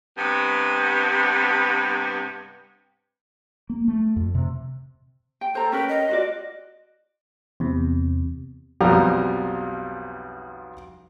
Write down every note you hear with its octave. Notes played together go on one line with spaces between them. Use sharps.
G2 C3 B3
A#3
A3
F2
C3
G5
A4 C5 A#5
C#4 A#4 B4 G5
D#5
F4 F#4 D5
E2 C3
B1 F2 G3 F5 A#5